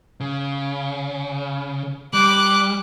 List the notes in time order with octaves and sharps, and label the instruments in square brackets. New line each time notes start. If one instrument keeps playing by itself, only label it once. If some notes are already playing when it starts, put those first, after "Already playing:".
[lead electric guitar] C#3
[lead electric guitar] G3 [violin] D6 F#6